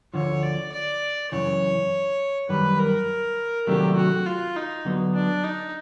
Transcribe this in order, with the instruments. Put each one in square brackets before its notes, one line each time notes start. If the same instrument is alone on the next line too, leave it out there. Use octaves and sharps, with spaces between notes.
[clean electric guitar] D2 D3 F3 [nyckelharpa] C#5
[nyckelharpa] D5
D5
[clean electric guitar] F#2 C#3 E3 [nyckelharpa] C#5
[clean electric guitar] F#2 D#3 G3 [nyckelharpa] B4
[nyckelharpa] A#4
[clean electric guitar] C3 D#3 F#3 A3 D4 [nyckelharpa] G4
[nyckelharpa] F#4
F4
D#4
[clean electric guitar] D3 F#3 B3
[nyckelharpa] D4
D#4